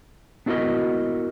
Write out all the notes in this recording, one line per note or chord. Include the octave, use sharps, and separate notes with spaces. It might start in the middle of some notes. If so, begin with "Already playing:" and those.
B3 D4 E4 F#4 A#4 D#5